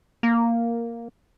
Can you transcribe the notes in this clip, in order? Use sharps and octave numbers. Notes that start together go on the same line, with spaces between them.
A#3